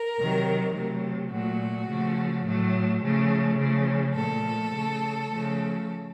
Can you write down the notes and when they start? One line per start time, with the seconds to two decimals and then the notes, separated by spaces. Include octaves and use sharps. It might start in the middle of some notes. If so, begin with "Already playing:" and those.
Already playing: A#4
0.19 C3 D#3 F#3
0.75 C3 F#3 A3
1.32 A#2 F#3 A3 F#4
1.88 C#3 F3 A3
2.45 A2 F#3 A3
3.02 C#3 F3 A3
3.58 C#3 F3 A3
4.15 A#2 F3 A3 A4
4.72 C#3 A3
5.29 C#3 F3 A3